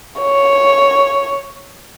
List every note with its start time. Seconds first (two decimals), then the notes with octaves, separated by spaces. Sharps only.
0.21 C#5